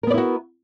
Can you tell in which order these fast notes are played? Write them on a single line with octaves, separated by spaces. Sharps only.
A#4 B3 D5 E4 F#4